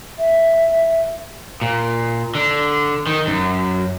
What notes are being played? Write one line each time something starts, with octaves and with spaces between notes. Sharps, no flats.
E5
A#2
D3
D#3
F#2